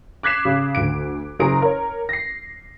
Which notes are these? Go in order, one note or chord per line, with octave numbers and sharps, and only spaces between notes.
D6 F#6 G#6 B6 C7 E7
C#3
D2 D7
F#1 F#2 G#4 A#5 D7
A#4 C#5
A#6 C7